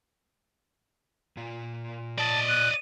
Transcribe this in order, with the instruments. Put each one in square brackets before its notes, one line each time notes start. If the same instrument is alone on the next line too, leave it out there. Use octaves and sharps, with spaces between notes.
[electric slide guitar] A#2 F4
[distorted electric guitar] D5 D#5 [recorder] A5
[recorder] F#6 [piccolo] D#7